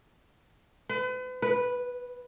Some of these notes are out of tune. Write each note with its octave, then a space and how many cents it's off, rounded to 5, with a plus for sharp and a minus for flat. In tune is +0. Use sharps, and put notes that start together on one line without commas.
B4 +40
B4 -5